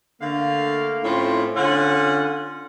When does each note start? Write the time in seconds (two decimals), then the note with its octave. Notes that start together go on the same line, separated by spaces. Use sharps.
0.20 D3 A3 A#3 F5
1.04 A2 C4 C#4 E4 F4
1.56 D3 C#4 F4 F#5